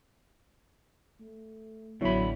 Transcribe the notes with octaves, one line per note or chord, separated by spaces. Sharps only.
A3
A1 D3 F#3 B3 E4 C#5 B5